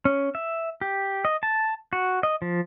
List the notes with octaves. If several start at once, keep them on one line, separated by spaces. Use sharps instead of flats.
C#4
E5
G4
D#5
A5
F#4
D#5
F3